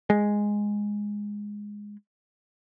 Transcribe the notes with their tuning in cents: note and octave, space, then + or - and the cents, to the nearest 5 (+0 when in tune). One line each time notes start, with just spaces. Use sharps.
G#3 -5